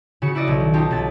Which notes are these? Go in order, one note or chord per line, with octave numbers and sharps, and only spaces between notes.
C#3 F#4 C#7
E4 F#4 D5 D#5
B1
D#3
C#4 D#4 F4 G4 A5
B1 A6